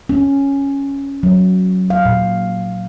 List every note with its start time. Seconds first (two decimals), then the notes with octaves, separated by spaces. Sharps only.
0.09 C#4
1.23 F#3
1.90 F5
2.06 A#2